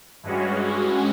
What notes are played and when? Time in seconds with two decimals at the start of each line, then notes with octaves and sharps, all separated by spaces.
0.23 G2 E3 G#3 C#4 F#4